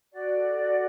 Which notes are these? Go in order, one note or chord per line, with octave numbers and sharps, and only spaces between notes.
F#4 D5
A4
F#4